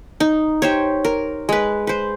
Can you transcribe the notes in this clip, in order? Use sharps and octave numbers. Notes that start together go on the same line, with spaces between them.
D#4
G4 C5 C#5
A#4
G#3 B4
B4 C5